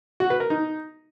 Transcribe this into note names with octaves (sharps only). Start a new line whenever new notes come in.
F#4
B4
A#4
D#4